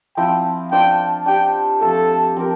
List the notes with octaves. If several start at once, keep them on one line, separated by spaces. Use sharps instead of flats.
F3 C4 E4 G5
D4 F4 C5 G5
D4 G4 C5 G5
F3 A3 C4 G4 A4
F3 C4 G4 A#4